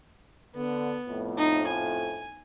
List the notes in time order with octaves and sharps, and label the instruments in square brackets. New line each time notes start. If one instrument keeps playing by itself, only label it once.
[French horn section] D3 [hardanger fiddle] B3
[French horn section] F2 A2
[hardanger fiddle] D#4
G#5